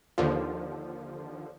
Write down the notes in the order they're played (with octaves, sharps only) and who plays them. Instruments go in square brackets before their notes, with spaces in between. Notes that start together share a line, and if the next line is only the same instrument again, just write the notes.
[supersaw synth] D#2 D3 F3